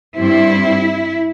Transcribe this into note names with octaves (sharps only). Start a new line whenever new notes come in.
G2 G3 C4 E4